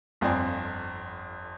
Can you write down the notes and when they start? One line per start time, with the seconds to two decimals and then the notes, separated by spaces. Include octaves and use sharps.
0.21 G1 F2 C4 D5 G#5